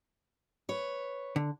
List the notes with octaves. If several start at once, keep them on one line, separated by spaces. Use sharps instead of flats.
B4 C#5
D3